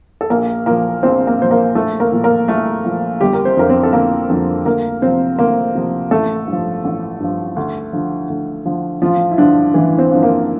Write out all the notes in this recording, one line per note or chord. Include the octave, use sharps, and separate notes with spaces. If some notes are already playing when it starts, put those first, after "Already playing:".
A4
A#1 A#3 A#4
A#2 F3 A#3 A#4
A#1 C4 C5
A#3 A#4
A#2 F3 C5
A#3 A#4
A#1 A3 A4
A#3 A#4
A#2 F3
A#3 A#4
A#1 A3 A4
A#2 F3
G1 G3 G4
A#4
C4 C5
F2 D3 F3 A#4
C4 C5
A4
G1 A#3 A#4
F2 D3 F3
D2 A#3 A#4
C3 F3 C4 C5
D2 A#3 A#4
C3 F3
A1 A3 A4
G2 F3
A1
G2 F3
D2
D3 F3
D2
D3 F3
A1 F3 F4
E4
G2 D3 F3 D4
A1 E3 E4
C4 C5
G2 D3 F3
A#3 A#4